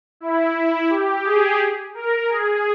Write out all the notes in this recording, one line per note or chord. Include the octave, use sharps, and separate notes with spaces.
E4
G4
G#4
A#4
G#4